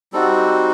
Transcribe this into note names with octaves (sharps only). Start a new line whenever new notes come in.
G3 C4 D#4 F#4 A4